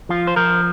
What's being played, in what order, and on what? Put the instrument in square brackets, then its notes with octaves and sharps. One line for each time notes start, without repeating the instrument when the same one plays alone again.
[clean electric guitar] F3 F4
C5
F3 A#4